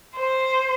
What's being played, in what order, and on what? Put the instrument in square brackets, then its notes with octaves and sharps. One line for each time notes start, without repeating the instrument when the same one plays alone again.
[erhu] C5